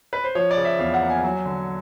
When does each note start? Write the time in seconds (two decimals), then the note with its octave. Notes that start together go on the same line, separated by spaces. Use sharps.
0.13 B4
0.24 C5
0.35 F3 C#5
0.51 D5
0.57 C#3
0.65 E5
0.79 E2 F5
0.94 F#5
1.02 A#3
1.09 G#5
1.23 F#3
1.45 D3